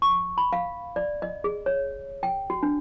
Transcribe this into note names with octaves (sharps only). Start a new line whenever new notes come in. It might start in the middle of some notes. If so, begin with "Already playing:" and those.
C#6
B5
F5
D5
D#5
G#4
C#5
G5
F#4
D4